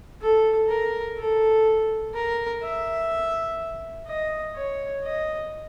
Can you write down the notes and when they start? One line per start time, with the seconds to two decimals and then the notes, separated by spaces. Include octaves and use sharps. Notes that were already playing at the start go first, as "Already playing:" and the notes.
0.21 A4
0.69 A#4
1.17 A4
2.15 A#4
2.63 E5
4.07 D#5
4.56 C#5
5.04 D#5